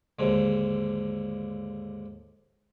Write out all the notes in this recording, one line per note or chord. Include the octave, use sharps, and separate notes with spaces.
D#2 G#2 D3